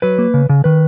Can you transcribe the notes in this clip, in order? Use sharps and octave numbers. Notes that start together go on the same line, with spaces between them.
F#3 B4
A#3
C#3
C#3
D#3 B4